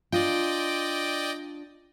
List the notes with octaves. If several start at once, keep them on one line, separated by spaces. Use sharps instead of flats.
D4 F4 D5 D#5 G5